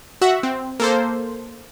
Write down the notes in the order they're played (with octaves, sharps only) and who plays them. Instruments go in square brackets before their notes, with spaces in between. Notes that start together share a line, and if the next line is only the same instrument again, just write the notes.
[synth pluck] F#4 E5 F#5
C4
A#3 A4 C5